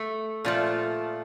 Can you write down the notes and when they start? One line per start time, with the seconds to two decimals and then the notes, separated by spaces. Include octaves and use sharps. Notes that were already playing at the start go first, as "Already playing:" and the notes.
Already playing: A3
0.45 A#2 F3 A3